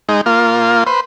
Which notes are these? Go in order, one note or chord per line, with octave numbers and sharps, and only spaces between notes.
G#3 D#4
A#3 F4
B4 C5